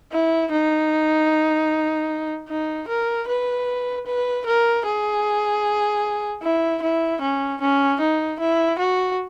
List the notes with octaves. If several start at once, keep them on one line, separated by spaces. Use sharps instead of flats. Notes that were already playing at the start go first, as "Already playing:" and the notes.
E4
D#4
D#4
A#4
B4
B4
A#4
G#4
E4
E4
C#4
C#4
D#4
E4
F#4